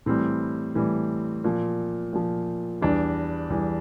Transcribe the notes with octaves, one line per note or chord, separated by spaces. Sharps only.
A2 E3 G3 C4
A2 E3 G3
A#2 F3
A#2 F3
E2 E3 G3 D4
E2 E3 G3